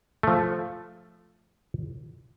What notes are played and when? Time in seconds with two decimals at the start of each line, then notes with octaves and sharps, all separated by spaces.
0.23 F3 A3